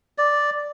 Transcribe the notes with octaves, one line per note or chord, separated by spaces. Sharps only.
D5